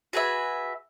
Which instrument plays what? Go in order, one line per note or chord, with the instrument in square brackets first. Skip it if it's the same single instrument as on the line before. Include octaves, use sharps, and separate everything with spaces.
[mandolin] F#4 G#4 B4 E5